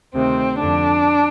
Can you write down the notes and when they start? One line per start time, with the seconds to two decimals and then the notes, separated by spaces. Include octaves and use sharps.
0.14 D2 C3 D#3 C4
0.60 F2 D3 D4